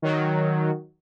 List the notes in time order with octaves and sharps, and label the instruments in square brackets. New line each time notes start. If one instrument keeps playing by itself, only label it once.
[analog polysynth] D#3 F#3